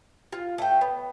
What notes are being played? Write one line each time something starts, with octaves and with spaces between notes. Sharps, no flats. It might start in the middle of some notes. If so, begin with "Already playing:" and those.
F4
A3 G5
B3